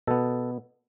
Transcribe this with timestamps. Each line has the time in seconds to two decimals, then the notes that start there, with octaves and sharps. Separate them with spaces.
0.07 B2 B3 A4